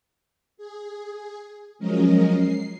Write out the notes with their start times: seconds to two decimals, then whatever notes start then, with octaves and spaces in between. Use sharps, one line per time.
0.57 G#4
1.79 F3 F#3 G#3 C#4 A#4 D#5
2.34 C7